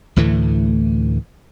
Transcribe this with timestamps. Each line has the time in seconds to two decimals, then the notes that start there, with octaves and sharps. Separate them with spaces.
0.16 D2 A2 E3 A3